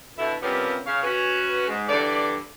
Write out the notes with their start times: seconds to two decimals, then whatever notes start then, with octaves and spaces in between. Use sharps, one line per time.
0.18 B2 D3 E4
0.42 C3 F3 G3 A#3 B3 C#4
0.85 C#3 C#5 F5
1.03 C#4 F#4 B4
1.68 G#2
1.88 G2 D3 E3 D5